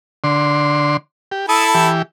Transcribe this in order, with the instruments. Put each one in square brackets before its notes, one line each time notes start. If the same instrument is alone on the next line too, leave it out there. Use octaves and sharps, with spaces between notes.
[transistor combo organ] D3 C6
G4
[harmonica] E4 A4 [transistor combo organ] D#6
[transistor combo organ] E3 G4